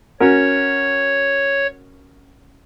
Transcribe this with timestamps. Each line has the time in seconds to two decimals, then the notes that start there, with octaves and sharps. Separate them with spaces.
0.20 C#4 F#4 A#4 C#5